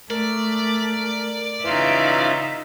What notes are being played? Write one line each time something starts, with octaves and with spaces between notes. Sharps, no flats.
A3 A#4 D5
C#3 E3 D#4 F4 E5